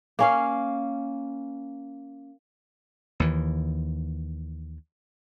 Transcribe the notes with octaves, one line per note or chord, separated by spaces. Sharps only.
A#3 C#4 F5
D#2 E3